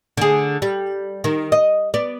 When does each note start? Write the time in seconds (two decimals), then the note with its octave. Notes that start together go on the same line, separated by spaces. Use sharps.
0.17 D3 G#4
0.62 G3
1.24 D#3
1.52 D#5
1.94 B3 D5